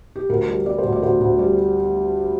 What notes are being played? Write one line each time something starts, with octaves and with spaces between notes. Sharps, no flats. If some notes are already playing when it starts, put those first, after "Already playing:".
G4
D2 A#4
G3
G3 D5
C5
D2
D5
D2 C5
D2
G3